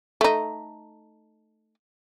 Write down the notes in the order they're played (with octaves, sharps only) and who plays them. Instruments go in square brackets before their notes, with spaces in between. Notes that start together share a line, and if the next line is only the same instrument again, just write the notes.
[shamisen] A3 D#4